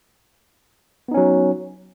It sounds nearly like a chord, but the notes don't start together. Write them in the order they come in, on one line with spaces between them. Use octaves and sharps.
B3 D#4 C#4 F#3